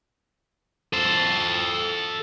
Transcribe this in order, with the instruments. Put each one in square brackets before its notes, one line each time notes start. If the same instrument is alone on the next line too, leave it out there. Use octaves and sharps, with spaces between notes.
[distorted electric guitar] A4 C5